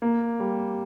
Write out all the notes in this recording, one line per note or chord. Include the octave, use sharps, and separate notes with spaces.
A#3
G3